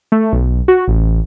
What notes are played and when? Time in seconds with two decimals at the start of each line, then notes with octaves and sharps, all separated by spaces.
0.12 A3
0.33 B1
0.68 F#4
0.88 A1